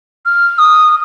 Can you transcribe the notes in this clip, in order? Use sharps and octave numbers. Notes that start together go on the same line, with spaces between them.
F6
D#6